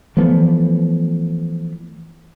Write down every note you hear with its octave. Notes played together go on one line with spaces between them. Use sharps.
E3 F3 A3 B3